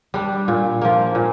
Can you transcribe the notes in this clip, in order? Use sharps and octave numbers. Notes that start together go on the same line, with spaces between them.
G3 D4
A#2
F3 A#3
A#2